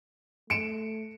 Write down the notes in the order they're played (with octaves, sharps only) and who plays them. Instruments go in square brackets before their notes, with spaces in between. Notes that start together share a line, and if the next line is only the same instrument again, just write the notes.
[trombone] A3 [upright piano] C#7 D7 E7